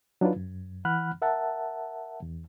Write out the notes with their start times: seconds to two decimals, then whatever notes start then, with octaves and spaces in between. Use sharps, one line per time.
0.21 F#3 D4 D#4 F4 B4
0.36 F#2
0.85 E3 F#5 B5 F6 F#6
1.22 A#4 E5 F#5 A5
2.22 E2